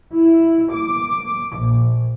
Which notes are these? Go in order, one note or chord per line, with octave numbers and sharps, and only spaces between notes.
E4
D6
A#1